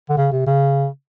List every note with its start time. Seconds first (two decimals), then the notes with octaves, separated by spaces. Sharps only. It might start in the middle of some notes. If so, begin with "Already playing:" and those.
0.09 D3
0.17 C#3
0.32 C3
0.47 C#3